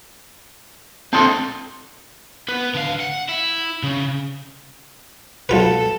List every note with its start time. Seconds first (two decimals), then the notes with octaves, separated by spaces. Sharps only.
1.13 C4 D4 A4 A5 C6 D#6
2.48 B3 B4
2.74 D3 F5
3.00 F#5
3.29 E4
3.83 C#3
5.49 B1 F4 A4 B4